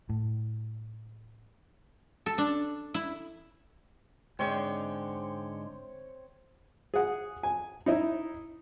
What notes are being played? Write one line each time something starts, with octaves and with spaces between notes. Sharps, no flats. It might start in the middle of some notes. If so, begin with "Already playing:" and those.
A2
A4
D4
E4
G#2 D3 G#3 C4 C#5 G5
G#4 F#5
G#5
D#4 E4 D#5